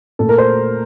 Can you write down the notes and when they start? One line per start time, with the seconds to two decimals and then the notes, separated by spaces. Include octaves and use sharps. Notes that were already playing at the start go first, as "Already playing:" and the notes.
0.19 A#2 A3 A4
0.29 A#4
0.38 C5